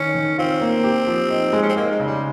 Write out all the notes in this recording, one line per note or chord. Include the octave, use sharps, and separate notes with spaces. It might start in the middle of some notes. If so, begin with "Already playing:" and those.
Already playing: D#3 C#4
D#3
C4 F4
A#3
G4
F3
D#4
G#3
C#4
C4
A#3 D#4
G#3
C#3
G3